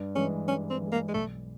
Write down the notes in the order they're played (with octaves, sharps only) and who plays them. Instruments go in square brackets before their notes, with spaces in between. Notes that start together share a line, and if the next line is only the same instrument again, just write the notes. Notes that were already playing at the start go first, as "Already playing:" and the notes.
Already playing: [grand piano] G2
[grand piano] E3 G#3 [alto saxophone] C#4
[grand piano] G2 [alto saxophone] C#4
[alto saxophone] C4
[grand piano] E3
G#3
[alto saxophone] A#3
G#3
[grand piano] B1 [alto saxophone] A3